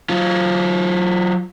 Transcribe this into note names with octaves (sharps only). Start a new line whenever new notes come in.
F#3 F4